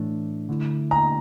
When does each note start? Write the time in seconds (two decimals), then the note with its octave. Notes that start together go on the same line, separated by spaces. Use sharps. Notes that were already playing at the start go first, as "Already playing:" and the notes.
Already playing: A2 E3 A3 D4
0.49 D3 A3 E4
0.91 A#5